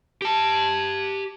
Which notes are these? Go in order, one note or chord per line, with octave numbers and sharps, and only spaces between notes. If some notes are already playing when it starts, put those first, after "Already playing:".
G4 A5